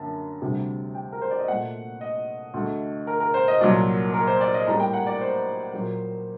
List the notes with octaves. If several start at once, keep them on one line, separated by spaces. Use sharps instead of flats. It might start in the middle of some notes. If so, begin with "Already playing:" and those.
Already playing: F#2 D3 A#3 A5
D2 C3 G3
G5
A#4
C5
D5
D#5
A#2 A3 F#5
D#5
D2 D3 A3
A#4
A#4
C5
D#5
C2 A#2 F#3 A#3 D5
A#4
C5
D5
D#5
A2 G3 A#3 A#5
G5
F#5
D5
C5
A#2 F#3 A#3